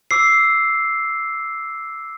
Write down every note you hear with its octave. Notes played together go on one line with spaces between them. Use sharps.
D6 E6 C7